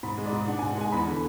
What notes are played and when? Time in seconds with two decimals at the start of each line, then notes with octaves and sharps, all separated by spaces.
0.03 G#2 B5
0.17 G#3
0.26 D5
0.32 G#2
0.48 D4 F#5
0.59 G#2 G#5
0.70 F#5
0.77 G#3 G#5
0.92 E2 B5
1.07 D3